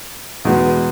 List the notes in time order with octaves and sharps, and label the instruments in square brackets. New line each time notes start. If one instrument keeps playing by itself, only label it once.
[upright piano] E2 B2 G#3 B3